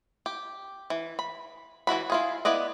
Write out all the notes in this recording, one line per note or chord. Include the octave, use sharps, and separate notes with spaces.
G4
E3
B5
E3 E4 F#4 B5
E4 F4 G#4
B3 E4 B4 D5 D#5